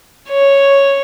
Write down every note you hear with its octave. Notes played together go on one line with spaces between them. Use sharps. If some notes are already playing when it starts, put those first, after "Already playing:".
C#5